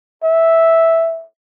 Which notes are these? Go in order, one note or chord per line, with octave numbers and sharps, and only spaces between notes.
E5